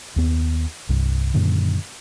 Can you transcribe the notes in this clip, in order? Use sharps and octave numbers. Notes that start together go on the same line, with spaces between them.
D#2 B3
C2 G2
F#2 A#2 D3 D#3